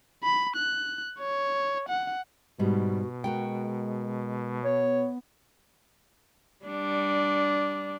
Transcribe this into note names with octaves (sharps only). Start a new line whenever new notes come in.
B5
F#6
C#5
F#5
G#2 B2 G3 F#4
G#3 F#4 A#4 G5
B3 C#5
G3 D4